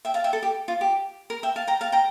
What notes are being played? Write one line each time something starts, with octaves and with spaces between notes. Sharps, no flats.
E5 G5
F5 A5
E5 G5
A4
G4
F4
G4
A#4
E5 G5
F5 A5
G5 A#5
F5 A5
G5 A#5